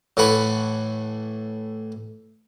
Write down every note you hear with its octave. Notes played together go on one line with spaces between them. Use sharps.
A2 E3 A3 F#5 G#5 B5